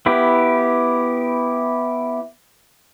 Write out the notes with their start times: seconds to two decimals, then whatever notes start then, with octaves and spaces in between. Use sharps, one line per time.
0.06 B3 E4 G4